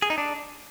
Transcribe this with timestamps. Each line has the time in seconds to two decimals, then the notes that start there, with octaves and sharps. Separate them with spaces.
0.02 G#4
0.10 D#4
0.18 D4